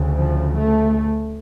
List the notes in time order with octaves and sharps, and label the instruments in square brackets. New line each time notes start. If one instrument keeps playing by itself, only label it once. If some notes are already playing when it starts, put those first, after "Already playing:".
Already playing: [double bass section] D2 C#3
F3
A3